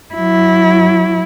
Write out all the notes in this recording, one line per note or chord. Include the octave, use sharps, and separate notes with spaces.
F#3 E4